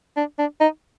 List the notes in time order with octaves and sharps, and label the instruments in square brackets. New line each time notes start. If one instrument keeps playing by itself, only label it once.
[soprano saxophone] D4
D4
D#4